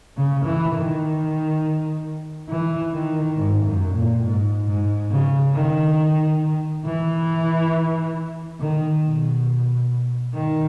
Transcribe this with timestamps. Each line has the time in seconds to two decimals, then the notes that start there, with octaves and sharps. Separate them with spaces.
0.17 C#3
0.45 E3
0.75 D#3
2.49 E3
2.93 D#3
3.37 G#2
3.66 F#2
3.94 A#2
4.23 G#2
4.68 G#2
5.11 C#3
5.54 D#3
6.85 E3
8.60 D#3
9.04 B2
10.35 D#3